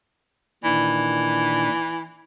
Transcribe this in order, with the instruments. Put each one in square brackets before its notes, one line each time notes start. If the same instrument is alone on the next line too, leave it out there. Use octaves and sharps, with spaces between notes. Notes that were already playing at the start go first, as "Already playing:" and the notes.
[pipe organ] A#2 D#3 D4 [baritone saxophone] E3